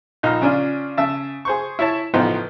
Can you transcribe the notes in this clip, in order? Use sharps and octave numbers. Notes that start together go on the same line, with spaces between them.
A#1 D#4 A#5 F6
C#3 C#4 D4 F4
C#3 E5 A5
G#4 C5 C#6
E4 C#5 A5
A1 F3 B3 D#4 C5 G5